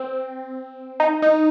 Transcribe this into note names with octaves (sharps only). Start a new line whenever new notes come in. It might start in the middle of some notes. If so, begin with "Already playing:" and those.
Already playing: C4
D#4
D#4